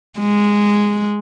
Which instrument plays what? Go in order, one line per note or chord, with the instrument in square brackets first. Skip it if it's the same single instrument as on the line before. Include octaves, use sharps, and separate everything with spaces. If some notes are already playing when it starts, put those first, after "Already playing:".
[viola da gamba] G#3